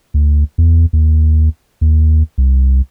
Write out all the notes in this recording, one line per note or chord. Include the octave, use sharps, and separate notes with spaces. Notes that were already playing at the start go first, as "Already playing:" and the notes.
D2
E2
D#2
D#2
C2